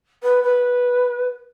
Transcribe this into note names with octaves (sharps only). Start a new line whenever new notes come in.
B4
B4